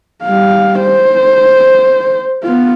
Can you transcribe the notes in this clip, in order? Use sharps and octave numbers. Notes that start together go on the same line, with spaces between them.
G3 F5
C5
B3 F4